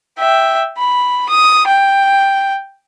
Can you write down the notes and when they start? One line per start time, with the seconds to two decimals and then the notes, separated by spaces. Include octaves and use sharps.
0.18 E5 G5
0.78 B5
1.29 D#6
1.68 G5